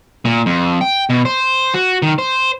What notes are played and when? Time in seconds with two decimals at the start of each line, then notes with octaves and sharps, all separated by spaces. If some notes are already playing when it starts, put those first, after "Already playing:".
0.25 A#2
0.46 F2
0.81 G5
1.10 B2
1.25 C5
1.74 F#4
2.02 D#3
2.18 C5